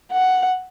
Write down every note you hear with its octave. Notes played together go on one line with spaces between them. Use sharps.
F#5